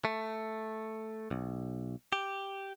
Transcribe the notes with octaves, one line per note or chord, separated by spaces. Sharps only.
A3
B1
G4